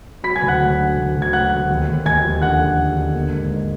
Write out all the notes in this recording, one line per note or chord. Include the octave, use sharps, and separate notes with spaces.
F#3 B5 B6
G#5 G#6
D2
F#5 F#6
F#3
D3
D2
D2
G#6
F#3 F#5 F#6
D2
D#2
D#2
D#2 G#5 G#6
F3
D3 F#5 F#6
D3
D#2
D3
A#3
G#2
G#2